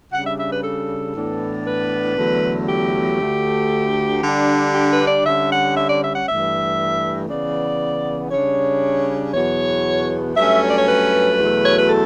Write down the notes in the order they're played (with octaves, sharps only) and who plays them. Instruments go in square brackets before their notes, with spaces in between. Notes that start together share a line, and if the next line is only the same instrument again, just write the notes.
[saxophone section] C#3 G3 D4 F#5
E5
E5
B4
A4
A2 E3 B3 D4
B4
E2 D3 F#3 A3
G4
D2 D3 A3
D3 G3 D4
G4
B4
D5
D3 G3 C#4 E5
F#5
E5
D5
E5
F#5
G2 E3 A3 E5
C#3 E3 B3 D5
C#3 G3 D4 C#5
E2 B2 F#3 B3 C#5
G2 F#3 A3 C#4 E5
C#5
D5
C#5
B4
E2 B2 F#3 A3
C#5
B4
A4